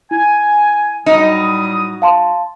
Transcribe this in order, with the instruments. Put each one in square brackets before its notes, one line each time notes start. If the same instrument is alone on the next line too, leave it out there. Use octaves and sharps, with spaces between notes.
[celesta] E4 [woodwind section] G#5
[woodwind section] A2 G3 D#6 [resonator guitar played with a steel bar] F#3 D#4
[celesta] F5 A5 C6